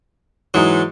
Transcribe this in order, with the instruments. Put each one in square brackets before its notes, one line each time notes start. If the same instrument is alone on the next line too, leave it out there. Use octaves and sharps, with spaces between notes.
[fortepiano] G#2 G#3 D#4 [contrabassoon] E3 [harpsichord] F#3